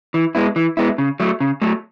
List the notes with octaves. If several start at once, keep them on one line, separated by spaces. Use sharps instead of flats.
E3
G#3 B3 E4
E3
G#3 B3 E4
C#3
F#3 A3
C#3
F#3 A3